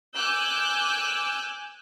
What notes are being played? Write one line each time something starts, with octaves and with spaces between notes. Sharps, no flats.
G#5 D6 E6 F#6 G6